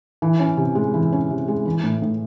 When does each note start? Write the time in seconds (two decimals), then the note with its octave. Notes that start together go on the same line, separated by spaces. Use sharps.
0.22 E3
0.40 C#4
0.57 C3
0.75 G#3
0.94 E3
1.12 C#4
1.30 C3
1.48 G#3
1.66 E3
1.83 A2
2.02 A2